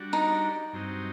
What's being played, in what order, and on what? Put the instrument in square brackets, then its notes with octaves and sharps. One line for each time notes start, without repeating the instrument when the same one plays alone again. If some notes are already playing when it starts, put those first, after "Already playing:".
Already playing: [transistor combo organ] G3 D4 F#4
[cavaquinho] D#4
[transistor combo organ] G2 F#3 C4 D#4